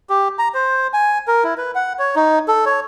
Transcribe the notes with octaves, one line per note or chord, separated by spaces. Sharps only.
G4
A#5
C5
G#5
A#4
E4
B4
F#5
C#5
D#4
A4
C#5